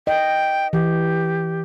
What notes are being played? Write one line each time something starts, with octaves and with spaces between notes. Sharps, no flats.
D#5 G5
E3 G4